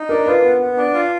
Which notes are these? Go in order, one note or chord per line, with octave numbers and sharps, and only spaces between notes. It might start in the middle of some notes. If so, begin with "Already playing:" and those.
Already playing: D#4
D4 A#4
F4 B4
B3
B3
D4
F4